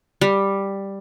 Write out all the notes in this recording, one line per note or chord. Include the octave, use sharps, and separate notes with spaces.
G3